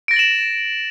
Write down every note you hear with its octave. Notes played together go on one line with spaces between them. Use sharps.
A6 A#6 D7 E7 F#7